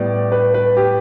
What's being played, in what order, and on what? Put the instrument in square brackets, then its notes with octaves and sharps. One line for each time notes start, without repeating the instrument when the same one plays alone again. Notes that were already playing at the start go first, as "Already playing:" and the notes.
Already playing: [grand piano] A2 G3 B3 D5
B4
B4
G4